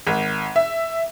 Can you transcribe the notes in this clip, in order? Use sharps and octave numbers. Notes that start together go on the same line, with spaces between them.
G#1
E5